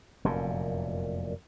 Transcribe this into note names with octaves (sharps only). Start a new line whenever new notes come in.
F1 F#2 A#2